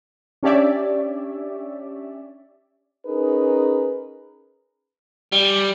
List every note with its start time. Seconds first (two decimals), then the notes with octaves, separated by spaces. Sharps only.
0.43 C#4 D4 G4 C#5 D5 E5
3.06 C#4 D#4 G#4 A#4 B4
5.32 G3